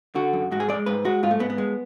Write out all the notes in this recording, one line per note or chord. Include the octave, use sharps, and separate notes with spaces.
D3 F#4
F#2
G#2 F#4
G#4
G#3 D5
G#2 B4
G#3 F#4
G#2 F4
A3
G#2 B3
B3
G#3